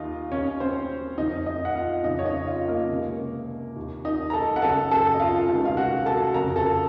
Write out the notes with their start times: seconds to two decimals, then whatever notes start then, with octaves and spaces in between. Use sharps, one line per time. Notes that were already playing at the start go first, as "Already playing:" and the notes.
Already playing: D#2 D#3 D#4 F4 D#5
0.32 D#2 D#3 C#4 C#5
0.60 C4 C5
1.18 F2 D#3 D#4 D#5
1.46 D#4 D#5
1.65 F#5
1.75 F4 F5
2.04 F2 C#3 D#4 D#5
2.19 C#5
2.25 D#4 D#5
2.47 F4
2.68 A#3 A#4
2.90 C#2 C3 D#3
3.76 D#2 D#3
4.05 D#4 D#5
4.30 A#5
4.33 A4 A5
4.56 F#5
4.62 F#2 C#3 A4 A5
4.91 A4 A5
5.14 D#5
5.20 F4 F5
5.48 C#2 C3 D#3
5.65 F5
5.77 F#4 F#5
6.06 A4 A5
6.34 F2 C#3 A#4 A#5
6.56 A4 A5